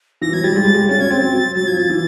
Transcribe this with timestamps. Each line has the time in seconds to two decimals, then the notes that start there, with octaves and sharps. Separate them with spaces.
0.21 E3 A#6
0.33 F#3 G#6
0.44 G3 A6
0.56 G#3
0.65 G3
0.74 G#3
0.89 C#4 A6
1.00 C#4 G#6
1.11 C4 A6
1.22 F#3
1.55 F#3 A6
1.67 F3 G#6
1.78 F3 A6
1.90 E3